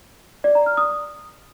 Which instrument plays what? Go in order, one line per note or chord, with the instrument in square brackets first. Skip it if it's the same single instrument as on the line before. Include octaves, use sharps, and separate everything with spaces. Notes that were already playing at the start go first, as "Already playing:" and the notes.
[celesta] D5
A#5
F6
D#6